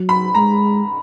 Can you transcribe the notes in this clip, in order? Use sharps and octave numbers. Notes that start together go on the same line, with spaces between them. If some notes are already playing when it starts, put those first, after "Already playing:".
Already playing: F#3
B5
G#3 A#5